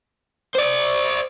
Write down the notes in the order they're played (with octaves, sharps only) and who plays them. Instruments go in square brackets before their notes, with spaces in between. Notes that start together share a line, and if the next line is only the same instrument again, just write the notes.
[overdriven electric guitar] C5 D5